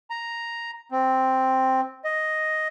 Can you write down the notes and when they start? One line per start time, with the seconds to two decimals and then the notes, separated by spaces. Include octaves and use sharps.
0.10 A#5
0.92 C4
2.05 D#5